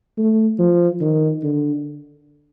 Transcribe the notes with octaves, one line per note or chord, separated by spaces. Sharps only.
A3
F3
D#3
D3